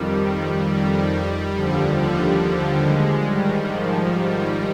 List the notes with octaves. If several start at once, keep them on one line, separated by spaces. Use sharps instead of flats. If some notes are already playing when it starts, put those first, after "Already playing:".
Already playing: F2 D#3 G3
G3
D#2 D3 F3
G3
G3
G#3
G#2 D#3 G3
F3
G3